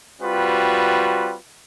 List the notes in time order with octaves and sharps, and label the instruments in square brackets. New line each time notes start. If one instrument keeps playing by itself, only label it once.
[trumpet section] G3 C4 F4 F#4 B4